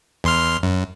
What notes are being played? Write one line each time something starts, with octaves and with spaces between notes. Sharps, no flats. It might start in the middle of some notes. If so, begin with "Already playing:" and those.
E2 C6 F6
F#2